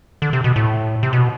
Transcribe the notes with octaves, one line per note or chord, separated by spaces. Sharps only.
D3
C3
B2
A2
C3
B2